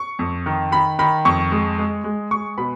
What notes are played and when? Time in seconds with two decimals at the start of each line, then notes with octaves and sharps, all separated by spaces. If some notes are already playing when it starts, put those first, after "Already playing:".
Already playing: C#6
0.19 F2
0.46 D#3
0.72 D#3 B5
0.99 D#3 B5
1.25 F2 C#6
1.51 G#3
1.78 G#3
2.04 G#3
2.31 G#3 C#6
2.58 B2 B5